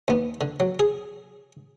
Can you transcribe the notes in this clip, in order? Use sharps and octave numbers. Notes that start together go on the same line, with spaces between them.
D#2 B3
D3
F#3
G#4